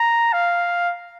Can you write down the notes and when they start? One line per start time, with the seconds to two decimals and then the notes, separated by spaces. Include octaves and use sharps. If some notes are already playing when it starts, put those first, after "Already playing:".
Already playing: A#5
0.33 F5